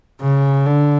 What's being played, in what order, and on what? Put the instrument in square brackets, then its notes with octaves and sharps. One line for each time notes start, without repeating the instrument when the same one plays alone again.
[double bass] C#3
D3